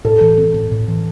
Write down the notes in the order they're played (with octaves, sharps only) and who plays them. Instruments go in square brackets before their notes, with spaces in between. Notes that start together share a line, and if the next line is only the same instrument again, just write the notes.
[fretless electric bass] A2 [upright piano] A4
[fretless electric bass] E3
C4
A2
A2
E3